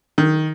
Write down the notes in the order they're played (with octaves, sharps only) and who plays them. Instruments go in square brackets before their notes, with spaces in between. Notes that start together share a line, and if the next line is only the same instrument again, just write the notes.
[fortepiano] D#3